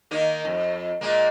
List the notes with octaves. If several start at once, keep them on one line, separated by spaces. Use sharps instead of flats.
D#3 A#3 D#4
F2
A#2 G#3 A#3